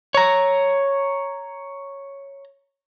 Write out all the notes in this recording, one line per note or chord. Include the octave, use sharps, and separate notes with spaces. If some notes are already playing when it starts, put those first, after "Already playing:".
C#5 A#5